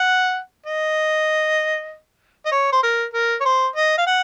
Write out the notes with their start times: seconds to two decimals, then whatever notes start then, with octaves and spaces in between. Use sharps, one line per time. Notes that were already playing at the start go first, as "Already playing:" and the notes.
Already playing: F#5
0.66 D#5
2.46 D#5
2.52 C#5
2.72 C5
2.83 A#4
3.14 A#4
3.40 C#5
3.45 C5
3.76 D#5
3.98 F5
4.07 F#5